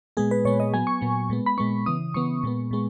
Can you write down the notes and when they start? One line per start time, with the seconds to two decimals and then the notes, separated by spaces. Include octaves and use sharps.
0.17 A#2 G#3 B3 G#4
0.31 B4
0.45 A#2 G#3 B3 C#5
0.60 D#5
0.73 A#2 F#3 B3 G#5
0.87 C#6
1.01 A#2 F#3 B3
1.30 A#2 G#3 B3
1.46 B5
1.58 A#2 G#3 B3 C#6
1.86 C#3 E3 B3 D#6
2.14 C#3 E3 B3 C#6
2.43 A#2 G#3 B3
2.71 A#2 G#3 B3